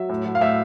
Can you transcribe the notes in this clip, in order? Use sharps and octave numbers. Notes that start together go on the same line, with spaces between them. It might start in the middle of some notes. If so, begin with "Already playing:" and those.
Already playing: F#3 E5
A2
F#3
F5
A2 E5